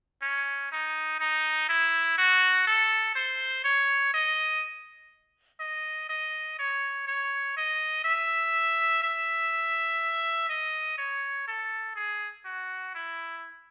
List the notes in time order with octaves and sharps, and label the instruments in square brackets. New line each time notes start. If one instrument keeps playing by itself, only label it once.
[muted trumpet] C#4
D#4
D#4
E4
F#4
A4
C5
C#5
D#5
D#5
D#5
C#5
C#5
D#5
E5
E5
D#5
C#5
A4
G#4
F#4
E4